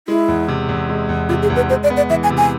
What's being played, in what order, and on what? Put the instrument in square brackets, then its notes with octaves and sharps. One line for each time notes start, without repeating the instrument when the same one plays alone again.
[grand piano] G#3 [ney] E4
[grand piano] E2
C3
E2
G#3
E2
[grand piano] C3 [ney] F4
[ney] G#4
[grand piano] E2
[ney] B4
[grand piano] G#3 [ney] C5
[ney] D5
[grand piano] B3
[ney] D5
[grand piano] E3 [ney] E5
[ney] G#5
[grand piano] C3
[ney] G#5